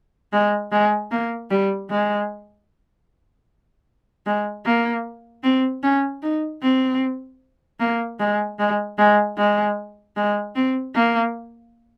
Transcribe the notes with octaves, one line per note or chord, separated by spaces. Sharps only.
G#3
G#3
A#3
G3
G#3
G#3
A#3
C4
C#4
D#4
C4
A#3
G#3
G#3
G#3
G#3
G#3
C4
A#3